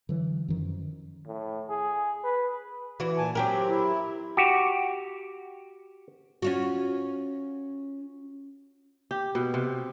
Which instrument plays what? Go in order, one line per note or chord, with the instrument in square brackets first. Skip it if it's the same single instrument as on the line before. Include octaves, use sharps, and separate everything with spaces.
[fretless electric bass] D3 E3 F#3
F#2 D#3 F3
[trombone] A2
G#4
B4
[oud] E3 F#4
[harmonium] A#2 G#5 A5
[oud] F#3 G4 A#4 [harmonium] C4
[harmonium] E4
[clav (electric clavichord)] F#4 G4
[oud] C#4 F4 F#4
[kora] G4
B2
C3